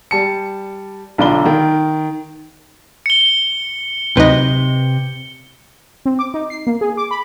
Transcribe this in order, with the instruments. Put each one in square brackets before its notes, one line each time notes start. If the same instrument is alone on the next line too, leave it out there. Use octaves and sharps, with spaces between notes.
[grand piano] G3 A5 C#7
B1 D3 F4 D5 B5 G7
D#3
[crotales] C#7 G7
[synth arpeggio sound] D2 F#3 D#4 [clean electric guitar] C3 [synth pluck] B4 D#5
[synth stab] C4
D6
D#4
C7
A#3
G#4
D6
B5